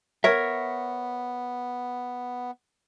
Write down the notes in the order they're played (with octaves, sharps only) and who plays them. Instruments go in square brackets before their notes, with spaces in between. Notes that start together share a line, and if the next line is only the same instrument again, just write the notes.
[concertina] B3 [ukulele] A#4 C#5 [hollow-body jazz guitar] E5